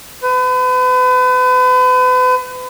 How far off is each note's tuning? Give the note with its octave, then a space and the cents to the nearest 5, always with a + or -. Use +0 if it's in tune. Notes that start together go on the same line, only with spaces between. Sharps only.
B4 +40